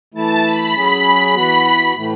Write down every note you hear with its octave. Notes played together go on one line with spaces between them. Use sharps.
E3 A3 E4 A5
B5
F#3 C#4 G#4
E3 B3 F#4
A2 E3 A3